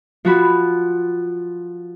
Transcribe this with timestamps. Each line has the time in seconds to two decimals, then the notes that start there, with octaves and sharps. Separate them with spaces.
0.25 F3 F#4 B5